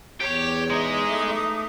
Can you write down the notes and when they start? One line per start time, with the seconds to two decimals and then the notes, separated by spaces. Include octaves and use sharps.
0.20 E2 G4 C#5
0.70 G#3 D#4 D#5 E5 D6 D#6
1.07 A3